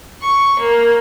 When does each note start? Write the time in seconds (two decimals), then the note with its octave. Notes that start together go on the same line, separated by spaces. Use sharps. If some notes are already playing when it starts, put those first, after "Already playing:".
0.22 C#6
0.60 A#3